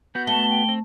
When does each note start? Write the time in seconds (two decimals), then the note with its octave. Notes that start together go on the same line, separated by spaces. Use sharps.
0.15 B3 F#4 G6
0.27 A3 A5 G7
0.50 G5
0.69 C4